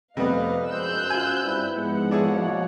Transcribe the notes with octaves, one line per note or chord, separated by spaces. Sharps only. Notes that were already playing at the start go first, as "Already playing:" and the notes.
F2 C3 G3 A3 B3 B4 D#5 F5
F#2 F3 G#3 C5 E6 F#6 G6
F4 F#4 G#5
G2 C4 E4 B4 D5
G#2 F3 G#3 B3 F#5
B2 A#3 D4 E4 G#4 C#5